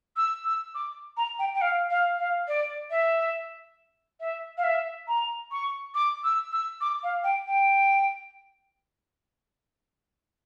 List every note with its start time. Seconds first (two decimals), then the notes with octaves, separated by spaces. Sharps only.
0.16 E6
0.44 E6
0.74 D6
1.17 A#5
1.39 G5
1.54 G5
1.61 F5
1.90 F5
2.19 F5
2.48 D5
2.90 E5
4.20 E5
4.57 F5
4.63 E5
5.08 A#5
5.51 C#6
5.94 D6
6.24 E6
6.52 E6
6.81 D6
7.03 F5
7.24 G5
7.46 G5